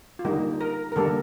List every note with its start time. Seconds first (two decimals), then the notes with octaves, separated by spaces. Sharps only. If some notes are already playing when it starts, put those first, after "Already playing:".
0.19 F4
0.25 D3 G3 A#3 D#4
0.61 A#4
0.92 A#4
0.96 D3 G3 A#3 A4